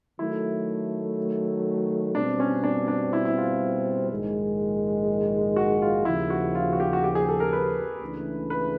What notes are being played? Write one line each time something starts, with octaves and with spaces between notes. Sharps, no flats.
D#3 F#3 A3 E4
B2 G3 C4 D4
C#4
D4
D4
E4
E4
F4
A#1 G#2 D#3 G#3
F#4
F4
D#2 C#3 F3 E4
F#4
F4
F#4
G4
F#4
G4
G#4
A4
A#4
B4
C#2 C#3 E3 A3 D4
B4